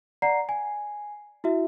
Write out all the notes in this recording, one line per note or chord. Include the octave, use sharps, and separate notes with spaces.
D5 F#5 A#5 C7
G#5
E4 F#4 E5